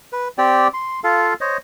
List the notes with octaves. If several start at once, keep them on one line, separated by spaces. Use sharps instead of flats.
B4
C4 G4 D5 G5
C6
F4 A4 F5
C5 C#5 D#5